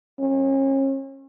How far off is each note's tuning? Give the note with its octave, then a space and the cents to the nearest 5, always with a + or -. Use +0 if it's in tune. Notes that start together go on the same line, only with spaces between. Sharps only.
C#4 -35